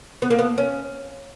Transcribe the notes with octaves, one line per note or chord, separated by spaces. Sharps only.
B3
A#3
B3
C#4